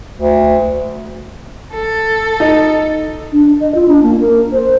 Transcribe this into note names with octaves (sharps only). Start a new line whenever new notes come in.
D2
A4
D#4
D4
D#5
F4
D4
A#3
A#4
C5